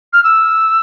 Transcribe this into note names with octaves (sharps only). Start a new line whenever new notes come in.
F6
E6